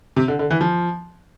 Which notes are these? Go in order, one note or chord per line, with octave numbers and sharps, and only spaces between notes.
C3
D3
D3
E3
F3